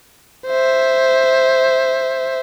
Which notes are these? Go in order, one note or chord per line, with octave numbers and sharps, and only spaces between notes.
C5 E5